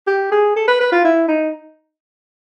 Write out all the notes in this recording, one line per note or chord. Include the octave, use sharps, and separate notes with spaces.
G4
G#4
A4
B4
B4
F4
E4
D#4